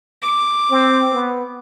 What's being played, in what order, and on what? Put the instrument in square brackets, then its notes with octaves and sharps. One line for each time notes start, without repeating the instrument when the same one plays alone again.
[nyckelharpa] D6
[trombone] C4
B3